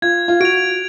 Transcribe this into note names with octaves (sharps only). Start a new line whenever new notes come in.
F4 G#6
F4
F#4 D7 F7